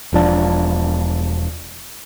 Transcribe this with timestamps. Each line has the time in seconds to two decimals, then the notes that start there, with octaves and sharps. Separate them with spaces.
0.13 E1 F3 D4